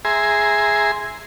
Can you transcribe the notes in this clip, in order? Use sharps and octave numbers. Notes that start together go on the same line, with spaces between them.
G#4 E5 G#5 A#5 C6